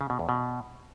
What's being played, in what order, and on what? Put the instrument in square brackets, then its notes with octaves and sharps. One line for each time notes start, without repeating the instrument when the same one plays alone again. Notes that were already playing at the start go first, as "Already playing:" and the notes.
[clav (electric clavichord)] C#3
B2
E2
B2